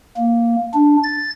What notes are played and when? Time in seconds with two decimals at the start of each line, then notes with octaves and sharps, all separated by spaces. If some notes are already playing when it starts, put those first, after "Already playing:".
0.16 A#3
0.74 D4
1.03 A6